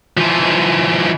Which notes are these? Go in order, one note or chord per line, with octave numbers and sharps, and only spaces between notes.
E3 F3